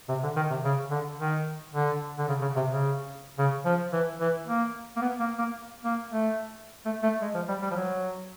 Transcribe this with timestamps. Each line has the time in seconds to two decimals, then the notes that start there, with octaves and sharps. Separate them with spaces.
0.09 C3
0.23 D3
0.36 D#3
0.50 C3
0.64 C#3
0.91 D3
1.19 D#3
1.74 D3
2.18 D3
2.28 C#3
2.41 C#3
2.56 C3
2.69 C#3
3.38 C#3
3.65 F3
3.92 E3
4.20 E3
4.47 A#3
4.97 A#3
5.01 B3
5.20 A#3
5.38 A#3
5.84 A#3
6.12 A3
6.85 A3
7.03 A3
7.22 G#3
7.34 F3
7.48 G3
7.62 G3
7.71 F3
7.76 F#3